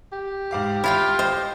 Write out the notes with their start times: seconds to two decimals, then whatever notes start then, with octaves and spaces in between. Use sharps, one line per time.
0.12 G4
0.51 G#2 F5 D6
0.84 E4 F4 E5 F5 G5
1.19 C5 D#5